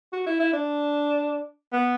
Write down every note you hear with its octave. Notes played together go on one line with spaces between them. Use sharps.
F#4
E4
E4
D4
B3